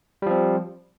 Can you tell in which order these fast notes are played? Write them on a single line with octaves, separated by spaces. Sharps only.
G3 F3 C4